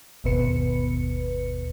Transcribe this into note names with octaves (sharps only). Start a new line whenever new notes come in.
G1 D#2 B2 B3 B4 C#7